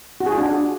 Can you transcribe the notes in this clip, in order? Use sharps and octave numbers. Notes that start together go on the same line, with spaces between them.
F#4
G#4
F4
D4